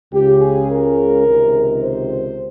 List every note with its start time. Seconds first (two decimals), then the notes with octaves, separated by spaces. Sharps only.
0.12 C#2 C#3 G4
0.41 G#4
0.70 A#4
1.26 C#2 C3 D#3
1.83 C5